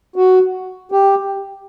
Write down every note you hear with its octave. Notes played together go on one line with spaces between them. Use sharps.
F#4
G4